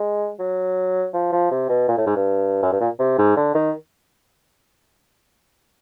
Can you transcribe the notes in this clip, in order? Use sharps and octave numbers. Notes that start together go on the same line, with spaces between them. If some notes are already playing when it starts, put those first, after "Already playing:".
Already playing: G#3
F#3
F3
F3
C3
B2
A#2
A2
G#2
G2
F#2
G2
A#2
C3
G#2
D3
D#3